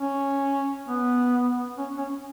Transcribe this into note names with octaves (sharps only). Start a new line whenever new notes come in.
C#4
B3
C#4
C#4